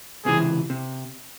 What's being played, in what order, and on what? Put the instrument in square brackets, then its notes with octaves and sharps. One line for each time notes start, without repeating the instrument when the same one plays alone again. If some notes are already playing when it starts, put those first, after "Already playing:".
[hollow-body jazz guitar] C#2 C3 E3 [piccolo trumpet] G#4
[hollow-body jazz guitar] C3